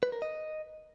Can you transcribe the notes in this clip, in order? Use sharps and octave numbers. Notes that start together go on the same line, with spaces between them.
B4
A#4
D#5